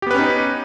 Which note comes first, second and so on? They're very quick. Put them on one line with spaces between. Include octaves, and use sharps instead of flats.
G4 B3 B4 C#4 D#4